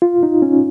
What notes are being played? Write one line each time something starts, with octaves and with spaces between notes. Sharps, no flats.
F4
D#4
C#4